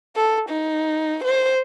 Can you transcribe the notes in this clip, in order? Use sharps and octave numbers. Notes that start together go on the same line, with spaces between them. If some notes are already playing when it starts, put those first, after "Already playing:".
A4
D#4
C5